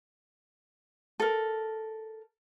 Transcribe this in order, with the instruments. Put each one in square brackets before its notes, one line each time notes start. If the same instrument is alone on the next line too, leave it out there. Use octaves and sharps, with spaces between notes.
[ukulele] A4 A#4